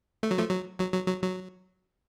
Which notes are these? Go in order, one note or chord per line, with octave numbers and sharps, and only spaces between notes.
A3
F#3
F3 A3
F#3
F#3
F#3
F#3
F#3